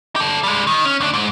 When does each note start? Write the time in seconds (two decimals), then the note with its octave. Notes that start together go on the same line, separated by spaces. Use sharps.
0.16 G4 A4
0.44 G3 G#3
0.67 D#3
0.85 C#4
1.01 D2 D4
1.13 G#2